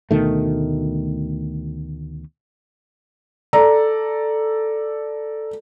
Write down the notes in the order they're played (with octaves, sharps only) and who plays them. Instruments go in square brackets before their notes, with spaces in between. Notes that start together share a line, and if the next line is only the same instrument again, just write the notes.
[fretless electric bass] D2 B2 D#3 A3
[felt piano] A4 D5 A#5